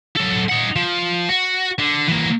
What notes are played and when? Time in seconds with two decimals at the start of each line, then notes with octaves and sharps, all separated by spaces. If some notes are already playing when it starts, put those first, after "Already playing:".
0.16 F#3 A4
0.49 D#4 F#5
0.76 F3
1.29 F#4
1.79 D3
2.08 E3 A#3